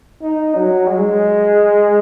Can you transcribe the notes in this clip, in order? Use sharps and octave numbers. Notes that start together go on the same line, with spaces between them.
D#4
F#3
G#3